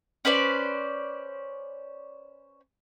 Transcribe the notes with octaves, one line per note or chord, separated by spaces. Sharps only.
C#4 B4 C5 D5